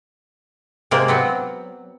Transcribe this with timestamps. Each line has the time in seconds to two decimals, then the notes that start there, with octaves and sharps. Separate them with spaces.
0.91 C3 G#3 A#3 C5 D5
1.08 F#3 B3 C4